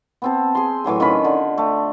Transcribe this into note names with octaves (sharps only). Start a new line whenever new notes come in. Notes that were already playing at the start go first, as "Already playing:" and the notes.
B3 C4 A5
G#4 C6
A2 E3 F#3 C6
D#3 C#4 F4 B5
D3
A3